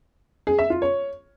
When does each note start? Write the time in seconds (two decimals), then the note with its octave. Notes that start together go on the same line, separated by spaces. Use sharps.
0.47 G#4
0.59 E5
0.70 F4
0.82 C#5